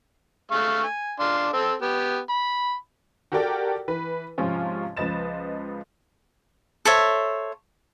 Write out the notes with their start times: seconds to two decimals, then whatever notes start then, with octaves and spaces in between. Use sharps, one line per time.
0.51 A3 F5 C#6
0.83 G#5
1.20 D4 F5 C6
1.53 C4 A4
1.82 B3 G4
2.30 B5
3.32 F#4 G4 A4 A#4 D5 G5
3.88 E3 B4
4.38 G#2 C3 F3 C#4 F4
4.97 C#2 F3 B4 D#5 A6 E7
6.85 A4 C5 C#5 E5